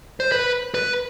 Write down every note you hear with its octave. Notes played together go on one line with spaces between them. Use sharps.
C5
B4
B4